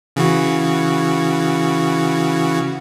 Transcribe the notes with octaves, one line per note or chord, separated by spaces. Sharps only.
C#3 E3 F#4